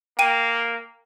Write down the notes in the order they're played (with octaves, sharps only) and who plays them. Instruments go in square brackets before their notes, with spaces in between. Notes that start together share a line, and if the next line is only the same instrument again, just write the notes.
[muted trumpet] A#3 [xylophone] G5 D#7